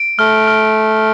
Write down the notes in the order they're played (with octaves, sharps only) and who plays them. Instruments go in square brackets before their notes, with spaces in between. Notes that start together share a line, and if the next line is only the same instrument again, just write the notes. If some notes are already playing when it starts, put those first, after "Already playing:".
Already playing: [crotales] D7
[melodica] A3 [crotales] F6
[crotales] F6